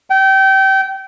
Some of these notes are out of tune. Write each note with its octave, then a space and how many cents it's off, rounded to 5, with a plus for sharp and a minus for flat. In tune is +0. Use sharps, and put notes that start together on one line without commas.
G5 -25